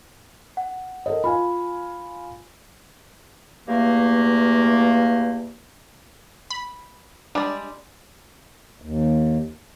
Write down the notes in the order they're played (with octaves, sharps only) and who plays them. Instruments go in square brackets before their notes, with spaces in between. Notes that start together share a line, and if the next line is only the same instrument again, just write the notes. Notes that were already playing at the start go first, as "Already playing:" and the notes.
[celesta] F#5
[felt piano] A4 A#4 D#5
[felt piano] F4 F5 G#5 [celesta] B5
[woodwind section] E2 G2 A3 A#3
[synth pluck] B5
[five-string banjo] G3 G#3 D5 [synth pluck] D4
[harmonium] D#2